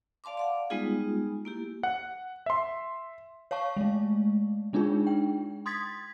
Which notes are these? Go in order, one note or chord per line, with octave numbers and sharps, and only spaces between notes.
D5 F5 A5 C6 D6
D5 F5 F#5
G3 G#3 B3 D#4 F4 G#4
A#3 E4 G4
F#5
E5 C6
C#5 F5 A5 C#6
G#3 A3
G#3 D4 D#4 F4 G#4
G5
C6 D#6 G#6 A6 B6